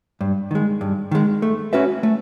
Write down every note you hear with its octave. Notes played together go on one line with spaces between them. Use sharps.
G2
D#3 G#3
G2
D#3 G#3
A3
C#4 F#4 B4 E5
A3